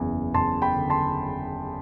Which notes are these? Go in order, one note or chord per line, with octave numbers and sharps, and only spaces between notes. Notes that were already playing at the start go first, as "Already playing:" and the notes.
Already playing: F#1 E2
F#1 A5 C6
G5 B5
D3
A5 C6